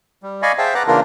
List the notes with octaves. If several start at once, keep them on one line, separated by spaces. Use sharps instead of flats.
G3
D5 D#5 F5 G#5 B5 C#6
G#4 C5 E5 F5 G5 A5
B4 F#5 A5 A#5 D6 F#6
C#3 E3 A#3 D4 F4 A#4